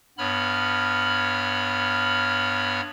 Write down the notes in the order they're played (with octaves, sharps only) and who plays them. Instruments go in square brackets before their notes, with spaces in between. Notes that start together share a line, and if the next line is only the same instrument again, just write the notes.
[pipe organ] G2 B3 C#5 B5 F6